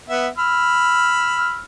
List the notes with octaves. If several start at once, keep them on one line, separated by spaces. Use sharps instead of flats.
B3 E5
B5 E6 F6